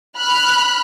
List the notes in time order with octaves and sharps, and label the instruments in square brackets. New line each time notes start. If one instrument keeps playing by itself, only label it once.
[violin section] B5 F6 F#6